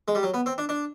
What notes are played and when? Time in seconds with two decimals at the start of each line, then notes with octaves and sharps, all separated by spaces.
0.08 G#3
0.15 G3
0.23 F#3
0.34 B3
0.46 C4
0.58 D4
0.69 D4